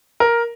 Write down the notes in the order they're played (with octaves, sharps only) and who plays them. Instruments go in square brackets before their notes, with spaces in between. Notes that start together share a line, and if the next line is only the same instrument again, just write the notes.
[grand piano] A#4